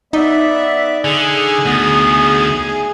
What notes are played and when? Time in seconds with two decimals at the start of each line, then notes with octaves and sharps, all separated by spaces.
0.13 B3 D#4 D5 E5
1.04 D3 G#4 G#5
1.65 D2 B3